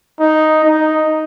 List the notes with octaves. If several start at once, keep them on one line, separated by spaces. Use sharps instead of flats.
D#4
D#4